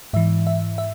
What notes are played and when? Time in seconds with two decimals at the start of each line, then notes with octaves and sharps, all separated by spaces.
0.13 G#2 E3 E5
0.47 E5
0.78 E5